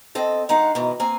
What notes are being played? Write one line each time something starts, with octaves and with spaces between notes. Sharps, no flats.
C4 A4 D#5
G#3 D#4 F5 F#5
G#2 B2 D#3 E3
A#3 C4 G#5